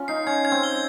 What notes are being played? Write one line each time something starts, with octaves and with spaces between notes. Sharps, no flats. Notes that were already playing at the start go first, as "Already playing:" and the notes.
Already playing: C#4 F4
D#4 C7
C#4 G#6
G#6
C4
G7